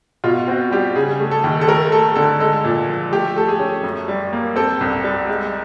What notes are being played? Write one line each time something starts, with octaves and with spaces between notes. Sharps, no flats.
B2 F4
C4 F#4
G3 G4
C#3 G#4
A3
A4
D#2
A4
A3 A#4
A3 A4
D3 A4
G#3 A4
A#2
F3
A3 G4
A3 A4
G#4
C#4
F#2
G3
A#3
C4 A4
C2
G3
G#3